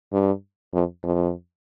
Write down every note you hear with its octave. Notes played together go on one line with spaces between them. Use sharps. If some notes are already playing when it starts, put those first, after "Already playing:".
G2
F2
F2